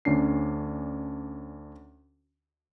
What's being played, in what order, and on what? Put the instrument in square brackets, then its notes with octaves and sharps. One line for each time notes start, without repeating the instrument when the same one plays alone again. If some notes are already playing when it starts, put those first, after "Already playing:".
[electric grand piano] D2 C#4 D4 C7